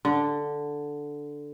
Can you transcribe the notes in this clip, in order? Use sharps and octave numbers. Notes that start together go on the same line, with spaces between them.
D3